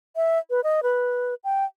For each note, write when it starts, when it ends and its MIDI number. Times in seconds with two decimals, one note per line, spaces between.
0.16 0.39 76
0.50 0.61 71
0.64 0.80 75
0.83 1.35 71
1.44 1.65 79